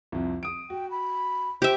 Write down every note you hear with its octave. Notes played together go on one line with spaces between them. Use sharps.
C2 F2
D#6 D7
F#4 G5
B5
G4 C5 E5